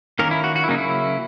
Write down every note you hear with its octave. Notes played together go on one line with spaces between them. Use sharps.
D#3 A#3 C#4 A#4
E4
F#4
F#4
E4
C#3 F#3 A#3 C#4 D#4
E4